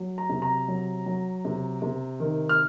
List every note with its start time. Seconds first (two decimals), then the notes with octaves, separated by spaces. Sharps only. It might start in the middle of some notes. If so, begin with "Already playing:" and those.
Already playing: F#3
0.18 A#5
0.29 C3
0.42 A#5
0.68 F#3
1.06 F#3
1.45 C3
1.82 C3
2.20 D#3
2.49 F6